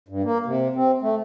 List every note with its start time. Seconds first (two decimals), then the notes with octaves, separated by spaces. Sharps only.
0.08 G2
0.24 A#3
0.46 C3
0.75 C4
1.02 A3